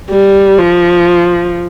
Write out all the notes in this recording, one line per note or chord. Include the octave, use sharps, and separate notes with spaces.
G3
F3